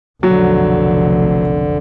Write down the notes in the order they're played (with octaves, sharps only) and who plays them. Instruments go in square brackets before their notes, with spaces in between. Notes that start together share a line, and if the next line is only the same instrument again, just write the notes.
[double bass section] F1 B1 F2 [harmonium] D3 [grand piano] F#3